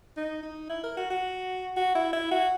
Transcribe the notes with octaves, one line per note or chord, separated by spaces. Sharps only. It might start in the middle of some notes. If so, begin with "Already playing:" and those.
D#4
D#4
E4
A#4
F#4
F#4
F#4
E4
E4
F#4